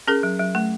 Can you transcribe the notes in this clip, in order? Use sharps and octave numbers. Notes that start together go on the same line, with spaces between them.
C#4 G#4 A#4
F#3
F#3
A3